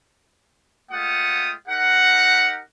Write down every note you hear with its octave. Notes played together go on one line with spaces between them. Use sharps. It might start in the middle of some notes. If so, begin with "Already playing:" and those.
G#3 A3 F4 F#5 G5 D#6
D#4 G4 A#4 F#5